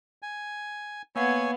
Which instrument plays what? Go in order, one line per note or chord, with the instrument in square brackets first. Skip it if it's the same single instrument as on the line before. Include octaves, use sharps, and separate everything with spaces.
[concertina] G#5
[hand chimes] A#3 F5 F#5 [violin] B3 [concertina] C#5 G#5